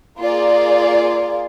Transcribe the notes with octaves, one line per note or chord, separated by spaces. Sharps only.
A#3 F4 G#4 D5